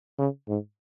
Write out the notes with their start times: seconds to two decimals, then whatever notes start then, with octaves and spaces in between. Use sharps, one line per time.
0.18 C#3
0.48 G#2